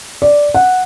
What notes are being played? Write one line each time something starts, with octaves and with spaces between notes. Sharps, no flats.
D5
F#5